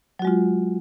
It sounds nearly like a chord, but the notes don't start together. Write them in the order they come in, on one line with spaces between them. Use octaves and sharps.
F#3 F#4 G#3 F4